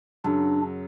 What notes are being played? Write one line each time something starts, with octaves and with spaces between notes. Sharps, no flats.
F#2 C#3 F#3 D4